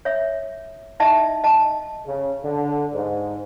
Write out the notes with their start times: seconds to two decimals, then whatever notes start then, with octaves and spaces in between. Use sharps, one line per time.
0.05 C#5 E5
1.00 D#4 E4 D#5 E5 A5
1.44 D#5 A5
2.06 C#3
2.44 D3
2.94 G#2